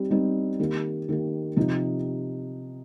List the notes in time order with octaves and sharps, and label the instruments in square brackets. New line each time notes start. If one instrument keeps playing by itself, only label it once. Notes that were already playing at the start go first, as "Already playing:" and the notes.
Already playing: [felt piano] G3 C4 D#4 G4
G3 C4 D#4 G4
D#3 A#3 G4
D#3 A#3 G4
C3 F3 D#4 G4